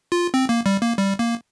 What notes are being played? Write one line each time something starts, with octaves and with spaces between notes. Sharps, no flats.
F4
C4
A#3
G3
A#3
G3
A#3